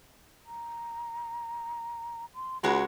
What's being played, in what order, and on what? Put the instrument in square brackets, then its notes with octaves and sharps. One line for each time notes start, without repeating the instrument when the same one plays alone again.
[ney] A#5
C6
[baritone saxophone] C#2 [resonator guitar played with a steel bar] G#3 F#4 [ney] B5